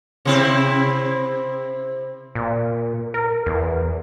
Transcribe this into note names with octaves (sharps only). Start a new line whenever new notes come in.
C3 C4 E4
A#2
A#4
E2